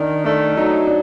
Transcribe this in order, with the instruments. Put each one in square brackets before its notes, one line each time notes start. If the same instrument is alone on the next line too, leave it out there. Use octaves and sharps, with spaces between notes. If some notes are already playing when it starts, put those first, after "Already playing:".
Already playing: [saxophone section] D#3 [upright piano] D4
[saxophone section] A3 [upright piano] D4
[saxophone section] F#3 [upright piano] D#4
[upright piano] D4